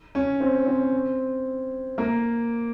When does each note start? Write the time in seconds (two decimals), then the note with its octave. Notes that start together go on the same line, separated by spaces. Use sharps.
0.15 C#4
0.40 C4
0.67 C4
1.98 A#3